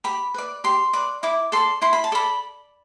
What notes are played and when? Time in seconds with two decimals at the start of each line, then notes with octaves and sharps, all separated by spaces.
0.04 G4 B5
0.34 B4 D5
0.64 G4 C6
0.93 B4 D5
1.23 E4 D6
1.52 A4 D5 C6
1.82 E4 C6
1.93 B5
2.04 A5
2.12 A4 D5 B5